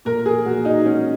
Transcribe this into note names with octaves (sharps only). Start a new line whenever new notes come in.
A#2 A#4
G#4
A#2 F#4
D#4
G#3 C#4